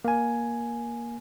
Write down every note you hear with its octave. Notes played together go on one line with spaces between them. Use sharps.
A#3 G#5